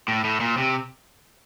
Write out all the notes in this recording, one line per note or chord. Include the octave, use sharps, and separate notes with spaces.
A2
A2
A#2
C3